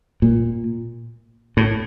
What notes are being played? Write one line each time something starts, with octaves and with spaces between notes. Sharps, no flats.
A#2
A2